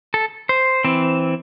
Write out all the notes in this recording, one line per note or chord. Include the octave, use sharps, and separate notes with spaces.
A4
C5
E3 C4